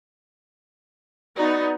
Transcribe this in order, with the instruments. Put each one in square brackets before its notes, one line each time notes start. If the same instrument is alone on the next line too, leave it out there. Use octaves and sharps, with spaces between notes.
[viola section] B3 D#4 F#4 [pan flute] D5